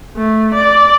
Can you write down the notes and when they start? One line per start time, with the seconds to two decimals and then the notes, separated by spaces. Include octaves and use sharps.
0.17 A3
0.54 D5